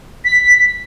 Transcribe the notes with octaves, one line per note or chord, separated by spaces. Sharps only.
B6